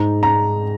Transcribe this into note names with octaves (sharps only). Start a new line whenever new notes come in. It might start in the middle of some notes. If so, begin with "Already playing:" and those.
Already playing: G#2 G#3 D#4 A#5
A#5